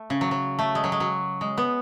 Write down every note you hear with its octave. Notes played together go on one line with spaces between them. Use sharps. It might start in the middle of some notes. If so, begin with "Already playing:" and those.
Already playing: A3
C#3
F#3
F#3
A3
G#3
F#3
G#3
F#3
G#3
B3